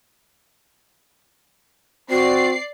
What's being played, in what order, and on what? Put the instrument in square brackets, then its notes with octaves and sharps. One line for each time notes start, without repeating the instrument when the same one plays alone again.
[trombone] C4 [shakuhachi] F#4 [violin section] D5 C7